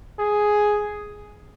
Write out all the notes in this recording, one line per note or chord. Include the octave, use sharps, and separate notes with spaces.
G#4